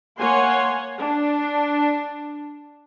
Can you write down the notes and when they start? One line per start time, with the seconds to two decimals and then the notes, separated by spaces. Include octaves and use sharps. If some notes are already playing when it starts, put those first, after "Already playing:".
0.18 A#3 C#5 F#5 G#5 C6
0.99 D4